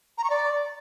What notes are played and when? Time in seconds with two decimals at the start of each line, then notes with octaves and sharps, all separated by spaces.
0.18 A#5
0.24 C#6
0.30 D5